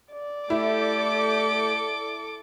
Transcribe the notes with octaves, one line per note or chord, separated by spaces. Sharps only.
D5
A3 E4 G4 A4 D6